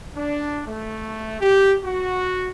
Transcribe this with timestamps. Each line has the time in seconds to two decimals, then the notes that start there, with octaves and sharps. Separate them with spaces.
0.15 D4
0.67 A3
1.41 G4
1.84 F#4